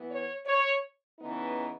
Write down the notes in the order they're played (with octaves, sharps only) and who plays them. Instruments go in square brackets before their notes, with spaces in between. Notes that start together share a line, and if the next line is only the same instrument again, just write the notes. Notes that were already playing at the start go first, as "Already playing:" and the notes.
Already playing: [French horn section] E3 B3
C#5
C#5
C#3 E3 B3 D#4